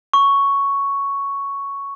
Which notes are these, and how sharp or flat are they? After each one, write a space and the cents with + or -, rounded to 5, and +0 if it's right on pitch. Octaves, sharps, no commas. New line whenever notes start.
C#6 +5